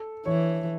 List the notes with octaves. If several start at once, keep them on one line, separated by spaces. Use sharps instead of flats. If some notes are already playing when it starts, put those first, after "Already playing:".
Already playing: A4
E3 C#5